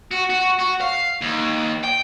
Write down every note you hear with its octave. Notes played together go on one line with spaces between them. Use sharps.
F#4
F#4
F#4
F5
D#2
G5